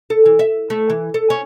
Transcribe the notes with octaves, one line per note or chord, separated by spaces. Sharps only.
A4
E3
E5
A3
E3
A4
C#4